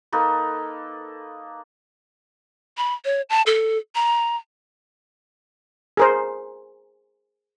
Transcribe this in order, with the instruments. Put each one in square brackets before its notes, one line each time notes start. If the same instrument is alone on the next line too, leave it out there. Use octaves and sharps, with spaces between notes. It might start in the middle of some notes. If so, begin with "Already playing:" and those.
[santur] A#3 D#4 A4 B4
[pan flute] B5
C#5
A5
A4
A#5
[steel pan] G#4 A#4 C5